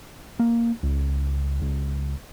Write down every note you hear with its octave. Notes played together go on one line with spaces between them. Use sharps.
A#3
C#2
C#2